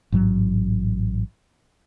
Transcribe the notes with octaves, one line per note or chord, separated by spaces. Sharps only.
A1 G#2 F#3